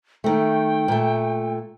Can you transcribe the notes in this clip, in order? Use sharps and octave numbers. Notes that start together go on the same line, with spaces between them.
D#3 A3 G5
A#2 A3